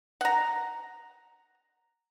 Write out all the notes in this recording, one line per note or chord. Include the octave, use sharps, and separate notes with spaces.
F#5 A#5